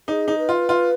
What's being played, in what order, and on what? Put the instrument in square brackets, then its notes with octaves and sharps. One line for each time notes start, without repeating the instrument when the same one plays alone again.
[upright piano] D#4 [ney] G#4
[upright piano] D#4
[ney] B4
[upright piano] F4
F4